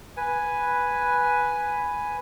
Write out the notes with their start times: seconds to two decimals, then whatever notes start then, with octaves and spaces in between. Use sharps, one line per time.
0.17 B4 G#5